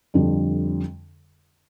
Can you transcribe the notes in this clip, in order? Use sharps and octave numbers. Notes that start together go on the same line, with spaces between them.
F2 D3 G3